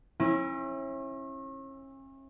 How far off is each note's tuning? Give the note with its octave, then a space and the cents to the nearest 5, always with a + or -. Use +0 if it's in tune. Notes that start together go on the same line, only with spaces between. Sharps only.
C#4 -40 E4 +0